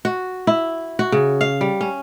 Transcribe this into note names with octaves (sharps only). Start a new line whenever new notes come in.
F#4
E4
F#4
C#3
F5
G3
C#4